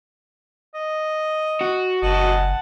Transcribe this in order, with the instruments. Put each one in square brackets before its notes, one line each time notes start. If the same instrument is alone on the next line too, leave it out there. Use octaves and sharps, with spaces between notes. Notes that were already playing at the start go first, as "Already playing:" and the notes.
[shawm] D#5
[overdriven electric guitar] F#4
[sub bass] F#1 [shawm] D#5 [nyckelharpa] F#5 A5